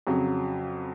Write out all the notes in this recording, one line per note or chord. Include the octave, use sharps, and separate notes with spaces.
F2 C#3 F#3